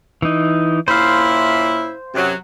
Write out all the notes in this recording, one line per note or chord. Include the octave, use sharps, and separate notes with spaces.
E3 D#4
A#2 C#4 E4 C5 F5
F#2 C3 F#3